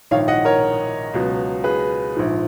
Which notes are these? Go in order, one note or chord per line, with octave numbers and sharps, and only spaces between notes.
A#1 G#2 D#3 C#5 F5
D#5 F#5
A#4 C#5
C#2 B2 F#3
G#4 B4
A#1 G#2 F3